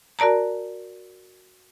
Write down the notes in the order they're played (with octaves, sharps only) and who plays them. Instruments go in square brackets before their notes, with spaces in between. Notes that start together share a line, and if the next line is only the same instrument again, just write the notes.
[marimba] F#4 A#4 D5 A5 A#5